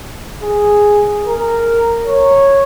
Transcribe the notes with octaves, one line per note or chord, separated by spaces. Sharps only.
G#4
A#4
C#5